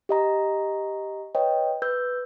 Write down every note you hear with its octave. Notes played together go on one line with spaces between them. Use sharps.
G4 D#5 A#5
B4 C#5 D#5 G5
B4 E6 G6